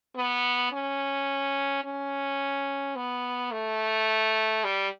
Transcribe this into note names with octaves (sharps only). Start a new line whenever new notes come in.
B3
C#4
C#4
B3
A3
G3